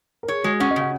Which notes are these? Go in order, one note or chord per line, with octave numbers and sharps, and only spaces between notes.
A#4
G#4 C#5
G#3 F#4
C#4 F#5
D#5
C#3 F#5